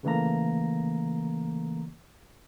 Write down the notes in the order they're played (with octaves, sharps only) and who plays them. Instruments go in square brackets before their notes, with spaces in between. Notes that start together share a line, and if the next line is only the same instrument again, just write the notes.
[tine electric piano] C#3 E3 A3 A#3 A#5